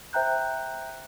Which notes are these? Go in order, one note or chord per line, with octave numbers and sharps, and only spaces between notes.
C5 E5 G5 A#5 F#6 G6